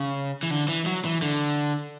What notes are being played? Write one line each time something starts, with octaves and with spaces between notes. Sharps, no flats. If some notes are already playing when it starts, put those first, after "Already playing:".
Already playing: C#3
E3
D3
E3
F#3
E3
D3